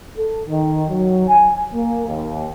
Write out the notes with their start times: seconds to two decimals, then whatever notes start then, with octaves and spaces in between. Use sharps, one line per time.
0.17 A4
0.48 D#3
0.90 F#3
1.28 G#5
1.74 A#3
2.07 D#2